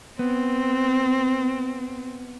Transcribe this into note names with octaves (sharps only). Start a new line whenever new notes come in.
B3 C4